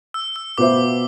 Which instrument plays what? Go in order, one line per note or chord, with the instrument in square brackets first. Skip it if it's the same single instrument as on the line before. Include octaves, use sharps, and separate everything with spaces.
[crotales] E6
E6
[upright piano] B2 B3 F4 C5 E5 [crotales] D6